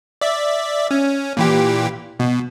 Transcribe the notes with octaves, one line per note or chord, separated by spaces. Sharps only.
D5 E5
C#4
A#2 E3 G4
B2